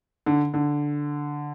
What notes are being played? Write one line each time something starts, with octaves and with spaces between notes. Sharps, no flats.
D3
D3